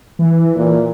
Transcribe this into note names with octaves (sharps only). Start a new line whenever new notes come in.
E3
A#2